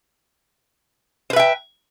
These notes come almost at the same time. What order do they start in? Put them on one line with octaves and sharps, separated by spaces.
C5 B4 E5 G5